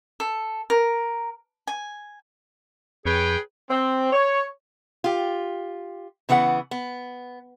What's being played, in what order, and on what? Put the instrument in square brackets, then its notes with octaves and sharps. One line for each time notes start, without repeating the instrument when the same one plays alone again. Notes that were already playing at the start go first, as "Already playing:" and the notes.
[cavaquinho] A4
A#4
G#5
[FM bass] F2 [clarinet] G#4 [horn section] B4 C#5 G5
[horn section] C4
C#5
[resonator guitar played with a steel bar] F4 G4
C#3 E3 B3 D#4 F#5
B3